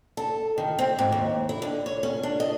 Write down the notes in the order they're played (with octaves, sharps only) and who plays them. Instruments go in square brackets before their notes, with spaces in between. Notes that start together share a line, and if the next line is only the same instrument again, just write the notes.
[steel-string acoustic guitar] A4
D#3
C4
G#2
D#2
E4
D3
C#5
C#4
D4
D#5